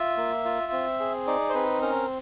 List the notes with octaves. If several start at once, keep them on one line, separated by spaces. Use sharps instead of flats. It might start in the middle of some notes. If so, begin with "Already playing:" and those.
Already playing: F4 E5
A#3
F4
C4
G#4
D#4 D5
C5
C4 B4
C#4 A#4